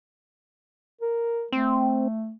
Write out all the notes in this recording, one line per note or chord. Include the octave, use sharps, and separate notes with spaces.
A#4
A3 C4